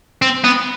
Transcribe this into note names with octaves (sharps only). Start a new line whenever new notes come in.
C4
B3